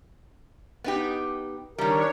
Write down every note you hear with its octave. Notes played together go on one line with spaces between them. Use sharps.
B3 D#4 G4
D#3 G3 D4 A#4 C#5